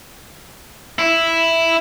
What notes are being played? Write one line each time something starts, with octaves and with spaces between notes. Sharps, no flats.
E4